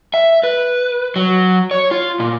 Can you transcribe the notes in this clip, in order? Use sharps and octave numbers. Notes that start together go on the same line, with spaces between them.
E5
B4
F#3
C#5
F4
A#2